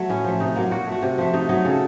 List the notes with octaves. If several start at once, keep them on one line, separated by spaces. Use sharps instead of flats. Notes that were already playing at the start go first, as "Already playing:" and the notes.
Already playing: F#3 A3
A2 C#4
F3 A3
C3 D#4
F#3 A#3
A#2 F#4
A3
F#4
C3
F3 A3
C3 D#4
F#3 A3 D#4
C#3
A4